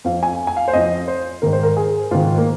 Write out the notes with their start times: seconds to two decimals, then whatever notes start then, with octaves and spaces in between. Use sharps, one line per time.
0.04 F2 F3 F5
0.23 G#5
0.47 G#5
0.57 F5
0.68 C5
0.73 F2 F3 D#5
1.08 C5
1.42 G#2 D#3 A#4
1.53 C5
1.63 A#4
1.77 G#4
2.11 G#2 D#3 F4
2.38 A#3